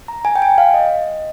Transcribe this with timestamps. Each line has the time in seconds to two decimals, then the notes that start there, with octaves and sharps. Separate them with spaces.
0.08 A#5
0.25 G#5
0.36 G5
0.42 G#5
0.58 F5
0.74 D#5